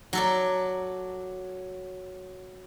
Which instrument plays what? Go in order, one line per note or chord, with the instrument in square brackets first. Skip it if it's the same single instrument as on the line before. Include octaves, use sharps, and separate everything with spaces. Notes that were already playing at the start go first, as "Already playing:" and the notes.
[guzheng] F#3 A4 D5